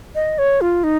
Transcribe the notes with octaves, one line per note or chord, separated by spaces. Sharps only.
D#5
C#5
F4
D#4